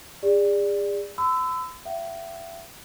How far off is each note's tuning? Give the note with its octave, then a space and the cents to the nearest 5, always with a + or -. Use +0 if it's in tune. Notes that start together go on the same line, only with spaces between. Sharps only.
G#4 -40 D5 +0
B5 +45 E6 +0
E5 +35 G5 -45